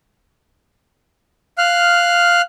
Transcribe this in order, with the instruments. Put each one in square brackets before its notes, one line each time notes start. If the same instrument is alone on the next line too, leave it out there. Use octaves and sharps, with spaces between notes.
[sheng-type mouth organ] F5 F6 F#6